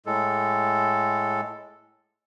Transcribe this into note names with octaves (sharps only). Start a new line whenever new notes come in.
A2 G#3 A4